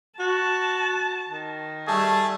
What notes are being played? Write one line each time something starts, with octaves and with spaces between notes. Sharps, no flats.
F#4 A5
D#3
G3 A3 G#4 A5